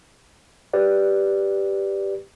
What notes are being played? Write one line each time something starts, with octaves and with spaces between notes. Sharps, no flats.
G4 B4 D5